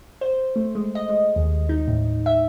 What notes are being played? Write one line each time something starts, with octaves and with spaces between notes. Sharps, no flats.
C5
A3
G#3
D#5
G#3
D#2
D#4
A2
E5